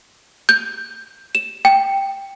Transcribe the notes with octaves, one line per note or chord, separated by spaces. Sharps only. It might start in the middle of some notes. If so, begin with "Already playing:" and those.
G6
E7
G5